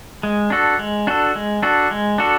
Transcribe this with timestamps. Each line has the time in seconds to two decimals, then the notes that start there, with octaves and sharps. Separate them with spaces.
0.23 G#3
0.50 D4 F#4 A4
0.79 G#3
1.07 D4 F#4 A4
1.35 G#3
1.63 D4 F#4 A4
1.91 G#3
2.18 D4 F#4 A4